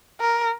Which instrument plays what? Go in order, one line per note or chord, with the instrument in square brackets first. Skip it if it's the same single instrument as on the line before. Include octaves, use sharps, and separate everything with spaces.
[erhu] A#4